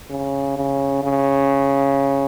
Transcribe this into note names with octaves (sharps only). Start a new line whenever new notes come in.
C#3
C#3
C#3